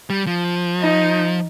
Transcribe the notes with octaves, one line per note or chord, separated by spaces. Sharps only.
G3
F3
D#4